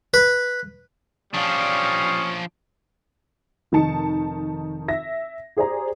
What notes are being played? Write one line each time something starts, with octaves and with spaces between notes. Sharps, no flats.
B4
F3 G3 C#4 D4 F5 D#6
F1 D#3 D#4 A5 C#7
E5 A#6
G4 G#4 C5 D5 A#5